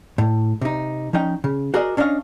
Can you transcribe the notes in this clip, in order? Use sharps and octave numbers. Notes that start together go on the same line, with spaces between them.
A2
C3 D#4
F3 C#4 D#4 G5
C#3
F#4 G#4 A#4 D5 D#5
C#4 D4 C#5 D#5 F5